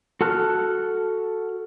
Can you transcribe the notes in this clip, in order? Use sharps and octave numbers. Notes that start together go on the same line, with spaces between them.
F#4 A4 A5 F6 F#6